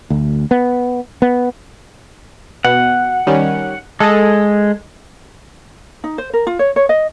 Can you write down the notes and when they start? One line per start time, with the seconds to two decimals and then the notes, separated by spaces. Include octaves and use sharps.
0.10 D2
0.51 B3
1.22 B3
2.65 B2 F#5
3.27 D#3 G3 C#4
4.00 G#3 A4 D#5
6.04 D#4
6.18 C5
6.33 A#4
6.47 F4
6.59 C#5
6.76 C#5
6.89 D#5